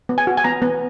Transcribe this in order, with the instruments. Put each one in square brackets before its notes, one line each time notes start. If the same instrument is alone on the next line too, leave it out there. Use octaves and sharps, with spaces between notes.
[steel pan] B3
G#5
F#4
G#5
B3 A#5
B3